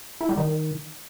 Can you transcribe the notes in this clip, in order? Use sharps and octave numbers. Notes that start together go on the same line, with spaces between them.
E4
G3
D#3